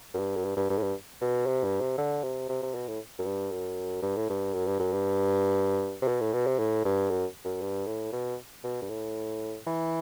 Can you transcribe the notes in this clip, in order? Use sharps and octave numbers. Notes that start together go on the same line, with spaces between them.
F#2
G2
F#2
G2
G2
G2
A2
G2
B2
C3
G2
C3
D3
C3
C3
C3
B2
A2
F#2
G2
F#2
G2
A2
G2
F#2
G2
F#2
G2
C3
B2
A2
B2
C3
A2
G2
F#2
F#2
G2
A2
B2
B2
G2
A2
E3